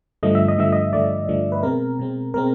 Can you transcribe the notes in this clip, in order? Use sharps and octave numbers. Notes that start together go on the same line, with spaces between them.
G2 D3 F3 A3 D#5
E5
D#5
G2 D3 F3 A3 E5
D#5
G2 D3 F3 A3 D5
G2 D3 F3 A3
B4
B2 G#3 C4 A#4
B2 G#3 C4
B2 G#3 C4 A#4